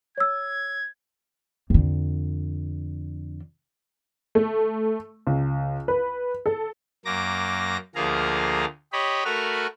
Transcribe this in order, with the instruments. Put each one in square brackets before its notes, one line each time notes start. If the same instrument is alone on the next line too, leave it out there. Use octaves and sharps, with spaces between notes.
[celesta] C#5 E6 [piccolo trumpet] G#6
[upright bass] F2 D3
[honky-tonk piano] A3
C#2
B4
A4
[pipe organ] F#2 A#3 D6 A#6
D2 F3 A#3 G#4 F5 A#5
G4 C#5 D#5 B5
A3 F#4 A#4 B4 F6